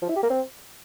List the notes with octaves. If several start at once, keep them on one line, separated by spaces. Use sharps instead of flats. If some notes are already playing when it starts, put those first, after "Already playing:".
F3
E4
G4
A#3
C4